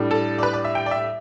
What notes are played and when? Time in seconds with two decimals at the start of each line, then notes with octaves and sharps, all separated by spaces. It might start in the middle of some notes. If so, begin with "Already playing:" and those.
Already playing: A2 G3 D4
0.11 A4
0.39 D5
0.43 B4
0.53 D5
0.65 E5
0.75 G5
0.86 D5
0.91 E5